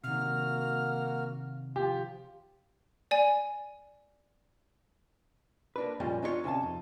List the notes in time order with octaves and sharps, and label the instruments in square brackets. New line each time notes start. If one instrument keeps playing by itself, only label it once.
[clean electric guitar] C3 D#3 [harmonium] A#3 F#4 [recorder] F6
[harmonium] F3 F4 [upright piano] G4
[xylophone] D5 G#5
[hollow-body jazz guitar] A#3 D4 B4
F#2 A#2 F3 G3 G#3 C#4
D4 D#4 F4 G4 C#5
D2 C3 C#4 F5 A5
F2 D#4